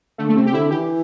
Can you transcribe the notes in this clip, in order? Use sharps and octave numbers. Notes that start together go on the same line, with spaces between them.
D3 A3
A3
C3 C4
G4
D3 E4
E3 G4